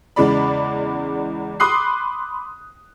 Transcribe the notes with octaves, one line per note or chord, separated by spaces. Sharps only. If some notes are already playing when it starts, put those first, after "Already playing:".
E2 C#3 E3 G#3 D5 B5
B5 C6 D6 D#6 F#6 C7